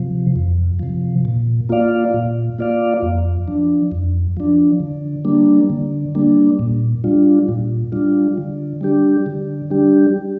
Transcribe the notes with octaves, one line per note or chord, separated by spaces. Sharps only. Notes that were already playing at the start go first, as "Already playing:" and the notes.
Already playing: C3 F3
F2
C3 F3
A#2
A#3 F4 D5 F5
A#2
A#3 F4 D5 F5
F2
F3 D4
F2
F3 D4
D3
G3 A#3 D4
D3
G3 A#3 D4
A#2
G3 D4 F4
A#2
G3 D4 F4
D3
G3 D4 G4
D3
G3 D4 G4